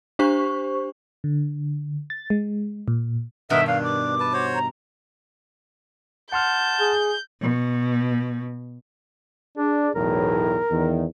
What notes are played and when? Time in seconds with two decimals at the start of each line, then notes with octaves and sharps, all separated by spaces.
0.19 D4 G4 C5 C#6
1.24 D3
2.10 A6
2.30 G#3
2.88 A#2
3.50 G2 B2 D#3 A#4 D#5 E5 F#5
3.67 D4 F5
3.84 D6
4.20 B4 A5
4.33 F#4 C5 C#5
4.54 A#5
6.32 F#5 A5 C6 F6 G6
6.80 G#4
7.42 B2
9.57 D4 G#4 D5
9.95 B1 E2 A2 A#4
10.71 E2 D#3